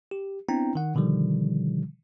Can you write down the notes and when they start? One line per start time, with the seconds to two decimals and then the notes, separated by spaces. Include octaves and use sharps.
0.11 G4
0.49 B3 C4 D4 E4 G5 A#5
0.75 D#3 F#5
0.95 B2 D3 D#3 F3 G3